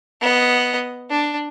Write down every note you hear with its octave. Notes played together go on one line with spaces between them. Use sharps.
B3 D#5
D4